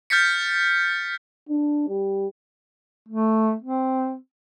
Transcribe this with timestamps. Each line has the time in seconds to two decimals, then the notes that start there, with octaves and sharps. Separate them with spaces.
0.10 F6 G6 A6 B6 C#7
1.49 D4
1.89 G3
3.09 A3
3.62 C4